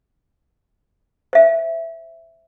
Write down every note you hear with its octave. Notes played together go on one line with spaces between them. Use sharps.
C5 E5